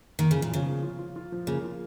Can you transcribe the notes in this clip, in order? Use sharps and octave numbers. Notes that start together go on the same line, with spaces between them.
D#3 A#3
C#3 F3
A#2
C#3 F3
F3
F4
F4
F4
F3
C#3 A#3
F4